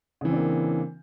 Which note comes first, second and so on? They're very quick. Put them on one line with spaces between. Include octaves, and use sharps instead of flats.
C#3 E3 C4 D4 A#3